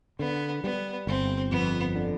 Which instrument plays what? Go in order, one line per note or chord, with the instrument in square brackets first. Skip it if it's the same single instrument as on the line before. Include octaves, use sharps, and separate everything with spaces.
[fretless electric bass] D3 [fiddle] B3
[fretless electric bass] G3 [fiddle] B3
[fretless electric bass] G1 [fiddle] C4
[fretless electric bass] F2 [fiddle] B3
[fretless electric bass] D3